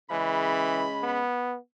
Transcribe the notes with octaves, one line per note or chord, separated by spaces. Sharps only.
C#3 E3 G#3 B5
B3